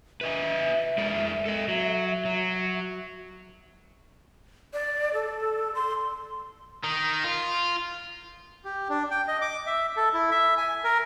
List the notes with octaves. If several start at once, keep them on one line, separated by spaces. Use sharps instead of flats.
B4 D#5 E5 G#5
G#3 A#4 D5
A4 D#5
F#3
F#3
D5
A4
C6
D#3
F4
G4
D4
G5
D#5
D6
E5
A4
E4
E5
G#5
A#4